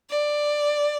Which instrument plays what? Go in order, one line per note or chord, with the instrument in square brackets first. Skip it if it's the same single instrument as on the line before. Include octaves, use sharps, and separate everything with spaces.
[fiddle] D5